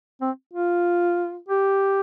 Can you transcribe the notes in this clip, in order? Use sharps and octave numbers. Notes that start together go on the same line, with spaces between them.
C4
F4
G4